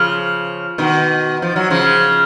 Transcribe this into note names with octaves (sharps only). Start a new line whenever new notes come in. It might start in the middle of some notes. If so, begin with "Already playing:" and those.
Already playing: C#3 F3
B2 D#3
F3
F#3
C#3 F3